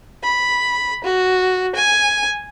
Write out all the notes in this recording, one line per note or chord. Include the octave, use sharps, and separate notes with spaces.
B5
F#4
G#5